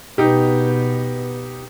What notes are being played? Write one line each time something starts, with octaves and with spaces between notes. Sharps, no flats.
B2 B3 D#4 G4